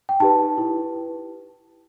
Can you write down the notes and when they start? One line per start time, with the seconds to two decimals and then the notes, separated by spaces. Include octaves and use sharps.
0.09 G5
0.20 D#4 G4 B4 A5
0.58 E4 B4